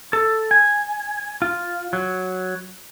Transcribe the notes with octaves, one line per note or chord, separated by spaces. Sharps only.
A4
G#5
F4
F#3